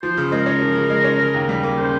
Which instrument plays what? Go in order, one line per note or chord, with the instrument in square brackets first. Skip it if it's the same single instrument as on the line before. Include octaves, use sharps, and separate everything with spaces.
[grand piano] F3 [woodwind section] C5
[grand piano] C#3
[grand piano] G#3 [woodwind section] A#4
[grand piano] C#4
F3
C#3
G#3
C#4
C#3
D#2
G3
A#3
[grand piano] C#3 [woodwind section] C5